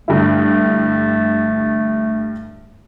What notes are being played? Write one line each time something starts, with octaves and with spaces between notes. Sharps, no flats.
G2 D3 A3 E4